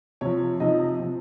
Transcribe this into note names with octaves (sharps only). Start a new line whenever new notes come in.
C3 F3 C#5
C3 F3 D#4 D#5
C3 F3